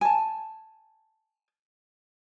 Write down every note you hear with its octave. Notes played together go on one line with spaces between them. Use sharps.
G#5 A5